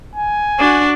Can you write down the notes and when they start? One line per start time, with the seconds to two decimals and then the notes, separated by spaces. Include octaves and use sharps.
0.15 G#5
0.59 D4 F#4